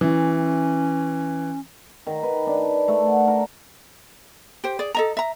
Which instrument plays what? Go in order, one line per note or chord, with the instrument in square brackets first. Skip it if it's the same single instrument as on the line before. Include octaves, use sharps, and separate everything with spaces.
[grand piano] E3 [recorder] C#4
[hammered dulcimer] D#3
B4
D4
A3
F#5
A#4
[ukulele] G4 C5
G#4 D5
A4 D#5 A#5
E5 A#5